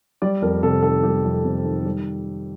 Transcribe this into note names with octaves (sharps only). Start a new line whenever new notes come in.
G3 D5
F2 A#4
C3 A4
D#3 A4
G3 G4
F2
C3
D#3
G3